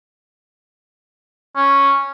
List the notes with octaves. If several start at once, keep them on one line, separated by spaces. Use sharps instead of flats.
C#4